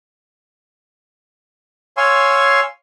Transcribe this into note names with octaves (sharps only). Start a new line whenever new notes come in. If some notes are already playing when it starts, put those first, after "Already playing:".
C#5 F5 G#5 C6 C#6 E6